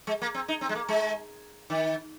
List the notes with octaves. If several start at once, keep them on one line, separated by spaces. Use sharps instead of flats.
G#3
A#3
C4
D#4
C4
G#3
A#3
G#3
D#3